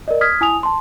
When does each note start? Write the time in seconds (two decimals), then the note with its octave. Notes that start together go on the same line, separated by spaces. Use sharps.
0.08 A#4 D5 D#5
0.21 D#6 F6 G#6 B6
0.41 E4 G#5 D#6 F7
0.63 A5 C6